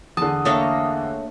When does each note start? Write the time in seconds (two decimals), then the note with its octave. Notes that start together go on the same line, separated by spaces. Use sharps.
0.17 E2 D3 A5 D#6
0.45 A3 A#3 D4 A4 C#5 D#5